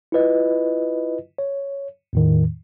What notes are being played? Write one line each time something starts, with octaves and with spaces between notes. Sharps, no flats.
E4 F4 B4 D#5
C#5
E2 A2 D#3